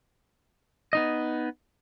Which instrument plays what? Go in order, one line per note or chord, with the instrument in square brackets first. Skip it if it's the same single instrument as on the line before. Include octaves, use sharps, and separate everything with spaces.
[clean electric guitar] B3 D#4 D#5